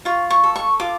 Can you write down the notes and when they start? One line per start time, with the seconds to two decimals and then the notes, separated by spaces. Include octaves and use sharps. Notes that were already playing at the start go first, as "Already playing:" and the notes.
0.05 F4 C#6
0.30 C#6
0.44 A4
0.56 C#6
0.80 F4 D6